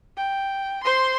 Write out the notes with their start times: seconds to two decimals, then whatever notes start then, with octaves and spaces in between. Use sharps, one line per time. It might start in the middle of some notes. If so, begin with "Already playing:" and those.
0.17 G5
0.84 C5 C6